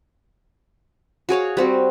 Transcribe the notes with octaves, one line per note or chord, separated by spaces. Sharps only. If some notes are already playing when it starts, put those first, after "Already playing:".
F#4 G#4 C#5 F5
G3 C4 F#4